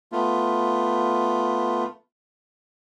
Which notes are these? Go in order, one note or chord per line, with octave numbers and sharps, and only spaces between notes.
A3 B3 F4